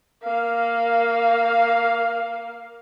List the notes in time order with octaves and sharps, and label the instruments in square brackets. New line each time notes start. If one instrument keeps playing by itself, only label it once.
[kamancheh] A#3 F5